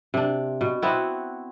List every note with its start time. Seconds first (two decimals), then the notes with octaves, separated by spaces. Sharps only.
0.14 C3 D4
0.61 B2
0.82 B3 C4 E4 F#4